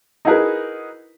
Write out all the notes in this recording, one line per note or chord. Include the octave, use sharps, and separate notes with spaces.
D#4 E4 F#4 G#4 A#4 B4